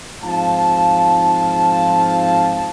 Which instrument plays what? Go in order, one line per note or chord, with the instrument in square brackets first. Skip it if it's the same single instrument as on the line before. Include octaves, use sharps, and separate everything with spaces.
[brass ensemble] G#2 F3 C4 F4 F5 A5